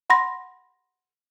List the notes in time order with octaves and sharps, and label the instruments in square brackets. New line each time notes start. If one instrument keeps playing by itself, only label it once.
[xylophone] F#5 B5 C6 A#6